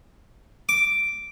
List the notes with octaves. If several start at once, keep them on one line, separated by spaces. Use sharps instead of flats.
D6